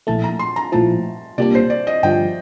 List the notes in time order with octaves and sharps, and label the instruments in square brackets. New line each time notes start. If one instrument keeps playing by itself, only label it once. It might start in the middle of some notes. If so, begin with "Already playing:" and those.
[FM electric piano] A#1 A2 A3 [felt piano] A5
[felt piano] A#5
C6
A#5
[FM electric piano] A#1 A2 F3 [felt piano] A5
[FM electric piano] C2 A#2 G3 A#3 D4 [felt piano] D5
[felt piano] C5
D5
D#5
[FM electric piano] G1 G2 F3 [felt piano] G5